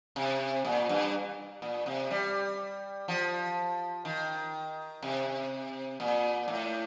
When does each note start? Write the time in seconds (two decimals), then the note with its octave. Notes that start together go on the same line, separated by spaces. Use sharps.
0.16 C3
0.65 A#2
0.89 G2
1.62 A#2
1.86 C3
2.11 G3
3.08 F3
4.05 D#3
5.03 C3
6.00 A#2
6.48 A2